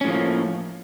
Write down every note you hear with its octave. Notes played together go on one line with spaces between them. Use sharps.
A2 F3 A#3 C#4